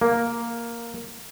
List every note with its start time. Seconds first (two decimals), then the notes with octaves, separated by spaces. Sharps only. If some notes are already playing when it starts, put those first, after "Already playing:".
0.01 A#3